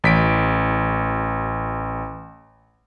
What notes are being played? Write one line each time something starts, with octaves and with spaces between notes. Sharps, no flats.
A1 B6 D7